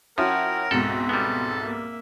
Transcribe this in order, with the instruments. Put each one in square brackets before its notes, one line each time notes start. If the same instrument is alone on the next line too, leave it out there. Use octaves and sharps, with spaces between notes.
[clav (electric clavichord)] F3 [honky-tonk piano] C#4 E4 F#4 [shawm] A#4 [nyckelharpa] F#5 G5
[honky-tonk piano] C#2 G#2 B2 [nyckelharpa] C4 E5 [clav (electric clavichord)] A4
[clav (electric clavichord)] G3 B3 [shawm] A4
[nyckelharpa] A#3 E5